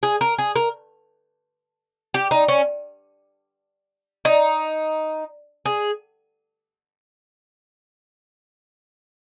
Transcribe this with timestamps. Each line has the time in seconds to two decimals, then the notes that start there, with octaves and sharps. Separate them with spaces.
0.03 G#4
0.21 A#4
0.38 G#4
0.56 A#4
2.14 G4
2.31 D#4
2.48 C#4
4.25 D#4
5.66 G#4